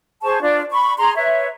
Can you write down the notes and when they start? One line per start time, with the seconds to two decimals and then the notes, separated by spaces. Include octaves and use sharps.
0.23 G#4 C5 A5 C#6
0.41 D4 F4 D5
0.72 B5 C#6
0.98 G#4 A#5 C6
1.16 B4 C#5 E5